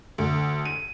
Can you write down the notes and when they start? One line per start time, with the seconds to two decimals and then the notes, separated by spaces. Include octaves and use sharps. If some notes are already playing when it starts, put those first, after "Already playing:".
0.18 D2
0.65 D#7